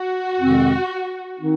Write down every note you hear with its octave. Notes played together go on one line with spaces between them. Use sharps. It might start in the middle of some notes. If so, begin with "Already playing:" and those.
Already playing: F#4
F2 C3 D#3 G#3 C4
D#3 C4 D#4